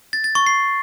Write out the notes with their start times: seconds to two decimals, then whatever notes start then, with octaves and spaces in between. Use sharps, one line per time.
0.13 A6
0.24 A6
0.35 C#6
0.46 C7